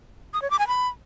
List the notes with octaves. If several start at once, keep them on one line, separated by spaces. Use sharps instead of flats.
D#6
C#5
D6
G#5
B5